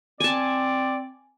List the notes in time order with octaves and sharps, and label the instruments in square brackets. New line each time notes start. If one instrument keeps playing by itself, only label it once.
[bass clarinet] C4 [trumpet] D5 [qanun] G#5 A5